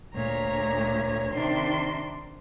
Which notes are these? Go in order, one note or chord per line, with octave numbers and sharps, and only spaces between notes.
D2 A#2 C#5 A#5
C3 D#3 D4 C6